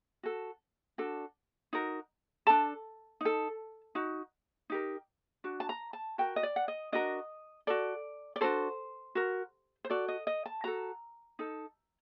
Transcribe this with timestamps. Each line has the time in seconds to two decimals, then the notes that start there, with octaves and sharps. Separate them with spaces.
0.23 F#4 A4
0.98 D4 F#4 A4
1.73 D#4 F#4 A#4
2.47 D4 A4 A5
3.21 D#4 A4
3.95 D#4 F#4
4.70 D#4 G4 A#4
5.44 D4 F#4
5.60 A5
5.69 A#5
5.93 A5
6.18 F#4 A#4 G5
6.36 D#5
6.43 D5
6.56 F#5
6.68 D#5
6.92 D4 F#4 A#4 D#5
7.67 F#4 A4 D5
8.36 D5
8.41 D4 F#4 A4 C5
9.15 F#4 A#4
9.84 C5
9.90 F#4 A4 D5
10.08 D#5
10.27 D#5
10.46 A5
10.64 F#4 A4 A#5
11.39 D#4 A4